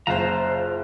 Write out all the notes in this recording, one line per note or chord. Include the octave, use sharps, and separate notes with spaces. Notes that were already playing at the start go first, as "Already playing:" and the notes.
F#1 F4 C5 F5 A5 A#5